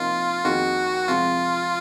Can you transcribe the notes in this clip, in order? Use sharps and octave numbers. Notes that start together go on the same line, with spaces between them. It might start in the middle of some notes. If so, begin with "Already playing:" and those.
Already playing: C3 F3 A#3 D#4 F4
F2 D#3 A#3 D#4 F#4 G#4
F2 C3 F3 G#3 F4